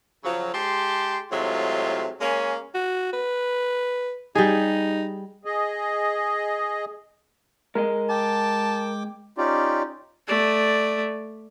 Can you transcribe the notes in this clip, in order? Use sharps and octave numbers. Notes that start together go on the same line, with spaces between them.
C#3 F3 F#3
G#3 G4 A5 C6
A2 C3 F#3 G#3 F4
G#3 A#3 C#4
F#4
B4
G3 D#4 G#4
G#4 D#5
G#3 G#4 A#4 D#5
G5 A5 D6
C#4 D#4 F4 G4 D5
A3 D5